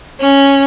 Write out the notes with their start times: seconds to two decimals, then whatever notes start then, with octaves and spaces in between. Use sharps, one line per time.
0.19 C#4